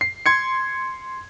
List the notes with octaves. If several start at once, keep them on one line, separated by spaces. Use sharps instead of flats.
C7
C6 G#6 C#7